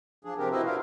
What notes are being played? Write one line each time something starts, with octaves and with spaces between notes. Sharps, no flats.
F3 D4 G#4
C3 C4 D4 G4 A#4
E4 F#4 B4 C5 D#5 E5
D4 F4 A#4 F5